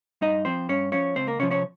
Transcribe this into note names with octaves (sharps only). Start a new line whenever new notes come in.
G2 D#4 D#5
F3 C4 C5
G2 C#4 C#5
F3 C#4 C#5
C#2 C4 C5
A#3 A#4
C3 F3 C#4 C#5
C#4 C#5